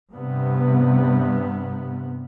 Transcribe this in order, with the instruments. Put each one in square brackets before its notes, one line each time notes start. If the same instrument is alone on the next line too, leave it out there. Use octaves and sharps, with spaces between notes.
[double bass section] G2 C3 B3